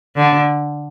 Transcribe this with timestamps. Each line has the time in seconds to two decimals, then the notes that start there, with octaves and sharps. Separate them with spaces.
0.16 D3